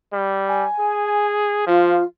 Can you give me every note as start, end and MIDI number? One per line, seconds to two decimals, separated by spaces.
0.13 0.65 55
0.48 1.28 80
0.79 1.62 68
1.67 2.01 53
1.67 2.03 65